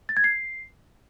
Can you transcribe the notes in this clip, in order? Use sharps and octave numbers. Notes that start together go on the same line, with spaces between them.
A6
G#6
C7